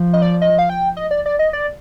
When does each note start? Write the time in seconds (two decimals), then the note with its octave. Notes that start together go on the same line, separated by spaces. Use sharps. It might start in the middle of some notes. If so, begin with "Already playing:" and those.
Already playing: F3
0.13 D#5
0.22 D5
0.42 D#5
0.59 F5
0.69 G5
0.97 D#5
1.11 D5
1.26 D5
1.39 D#5
1.53 D5